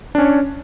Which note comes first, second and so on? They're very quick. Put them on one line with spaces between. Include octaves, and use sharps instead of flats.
D4 C#4 C#5